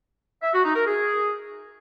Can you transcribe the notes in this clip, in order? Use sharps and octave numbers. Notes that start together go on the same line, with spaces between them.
E5
F#4
D#4
A#4
G#4